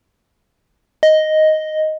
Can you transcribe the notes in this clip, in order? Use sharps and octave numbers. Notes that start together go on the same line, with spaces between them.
D#5